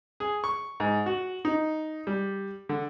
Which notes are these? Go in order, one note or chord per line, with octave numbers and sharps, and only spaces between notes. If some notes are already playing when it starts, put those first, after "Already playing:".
G#4
C#6
G#2
F#4
D#4
G3
D3